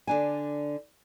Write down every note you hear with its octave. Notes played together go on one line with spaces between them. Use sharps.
D3 D4 G#5